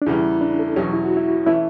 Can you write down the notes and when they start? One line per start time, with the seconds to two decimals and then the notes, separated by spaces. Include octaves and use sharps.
0.02 D4
0.06 E2 C#3 E3 G3 E4
0.41 D4
0.59 A4
0.76 E2 B2 F#3 C#4 G4
0.93 E4
1.05 F#4
1.17 E4
1.46 E3 A3 C#4 E4